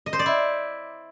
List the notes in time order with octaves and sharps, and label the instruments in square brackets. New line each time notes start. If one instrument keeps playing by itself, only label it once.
[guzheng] D#5
C5
D5
E4